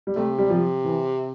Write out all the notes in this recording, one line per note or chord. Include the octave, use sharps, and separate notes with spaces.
G3
C3 A3
G3
F3
E3